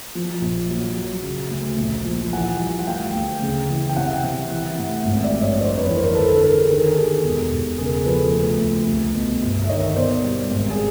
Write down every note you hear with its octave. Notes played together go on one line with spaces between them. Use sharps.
F3
A#1
F#3
F#3
C#3
D2
A#1
F3
E3 F#5 G#5
G3
F#5
D2 F5 G5
D2
C#3
E3
G5
C3 E5 F#5
C3
E3
A2
G#1
D5 E5
G2
C#5 D#5
F2 C5 D5
B4 C#5
E3
A#4 C5
D3 A4 B4
B4
D3 G#4 A#4
D#3 A#4
A4
G#4
D#3 G4 A4
E1
E1
C#3 G#4 A#4
F3 A4 B4
D2
D2
C2
B2
G1
E5
D#3 C#5 D#5
B2 C5 D5
G3
G#1
G#4